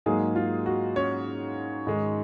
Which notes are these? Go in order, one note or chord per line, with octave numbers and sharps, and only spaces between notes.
G#2 F#3 G#3 A#3 G#4
F4
F#4
C#4 C#5
G#2 D#3 G#3